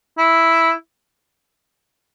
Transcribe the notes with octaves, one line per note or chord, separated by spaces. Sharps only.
E4